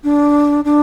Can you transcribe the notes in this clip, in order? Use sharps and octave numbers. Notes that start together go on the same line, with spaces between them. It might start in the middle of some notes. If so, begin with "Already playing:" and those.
D4
D4